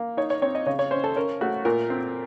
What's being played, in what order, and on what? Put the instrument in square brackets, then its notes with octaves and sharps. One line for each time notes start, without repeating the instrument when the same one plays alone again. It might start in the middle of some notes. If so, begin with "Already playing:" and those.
Already playing: [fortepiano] A#3
D#4 C#5
C#5
C4 C#5
D#5
C#3 C#5
C#5
C#4 C5
A4
C#4 A#4
A3 F#4
A#2 A#4
C4